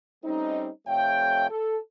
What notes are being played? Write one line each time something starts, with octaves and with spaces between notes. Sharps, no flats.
G3 A3 C4 C#4 D#4
F2 C3 A3 C#5 F5 G5
A4